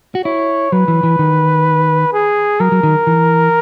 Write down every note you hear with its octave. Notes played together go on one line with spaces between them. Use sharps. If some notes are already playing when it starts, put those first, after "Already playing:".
F#4
E4 C#5
F#3 B4
E3
E3
D#3
G#4
F#3 A#4
F#3
D#3
E3